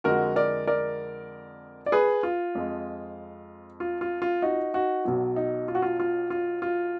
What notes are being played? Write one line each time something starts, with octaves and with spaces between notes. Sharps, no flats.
F2 D3 F3 G#3 F#4 A#4
A#4 D5
A#4 D5
D5
G#4 B4
F4
F2 F3 G#3
F4
F4
F4
D#4 F#4
D#4 F#4
B1 B2 F#3
D#4
F4
F#4
F4
F4
F4
F4